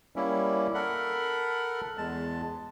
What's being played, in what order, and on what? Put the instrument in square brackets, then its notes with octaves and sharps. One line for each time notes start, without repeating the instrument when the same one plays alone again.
[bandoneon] G3 A#3 C#4 E4
A4 A#4 F#5 B5
E2 G#3 A5